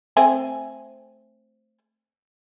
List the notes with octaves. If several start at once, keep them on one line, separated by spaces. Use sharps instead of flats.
A3 C4 G#5